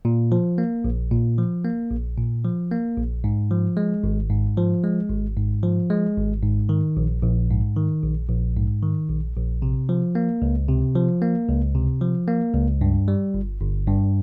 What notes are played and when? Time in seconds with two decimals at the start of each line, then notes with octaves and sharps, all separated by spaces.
0.05 A#2
0.32 F3
0.58 A#3
0.84 A#1
1.12 A#2
1.38 F3
1.65 A#3
1.91 A#1
2.17 A#2
2.45 F3
2.71 A#3
2.97 A#1
3.24 G#2
3.51 F3
3.77 G#3
4.04 G#1
4.30 G#2
4.57 F3
4.84 G#3
5.10 G#1
5.36 G#2
5.63 F3
5.90 G#3
6.17 G#1
6.43 G#2
6.69 D#3
6.97 A#1
7.23 A#1
7.50 G#2
7.77 D#3
8.03 A#1
8.29 A#1
8.56 G#2
8.82 D#3
9.09 A#1
9.36 A#1
9.62 C3
9.89 F3
10.15 A#3
10.42 C#2
10.69 C3
10.95 F3
11.22 A#3
11.48 C#2
11.75 C3
12.01 F3
12.28 A#3
12.55 C#2
12.81 G2
13.08 G3
13.34 G1
13.61 G1
13.88 G2